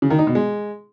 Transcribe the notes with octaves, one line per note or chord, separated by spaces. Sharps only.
C#3
D#3
D#4
B2
G#3